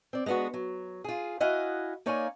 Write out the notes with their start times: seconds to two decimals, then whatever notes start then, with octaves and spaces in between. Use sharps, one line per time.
0.13 C4 D5
0.26 G#3 A3 B3 D4 F#4
0.54 F#3
1.04 F4 G#4
1.40 E4 F#4 D#5 F5 F#5 G#5
2.06 A#3 D#4 C#5 D5 F5 G#5